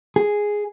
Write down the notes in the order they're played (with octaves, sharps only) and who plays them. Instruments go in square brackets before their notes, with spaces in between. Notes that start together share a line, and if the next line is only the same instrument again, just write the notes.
[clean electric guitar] G#4